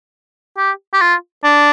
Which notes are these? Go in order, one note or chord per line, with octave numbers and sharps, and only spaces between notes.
G4
G4
F4
D4